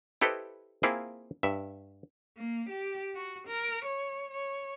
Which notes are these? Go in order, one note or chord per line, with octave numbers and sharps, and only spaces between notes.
E4 G4 A4 B4 C5 D#5
A#3 C4 E4 F4 G#4
G2 E5
A#3
G4
F#4
A#4
C#5
C#5